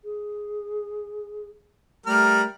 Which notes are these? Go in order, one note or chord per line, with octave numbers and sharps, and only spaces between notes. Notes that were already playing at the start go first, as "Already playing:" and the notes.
G#4
G3 A3 A#4 F6